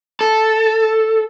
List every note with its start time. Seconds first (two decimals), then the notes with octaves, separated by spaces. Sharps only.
0.21 A4